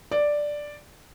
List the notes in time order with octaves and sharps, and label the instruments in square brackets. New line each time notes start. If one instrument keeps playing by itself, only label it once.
[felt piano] D5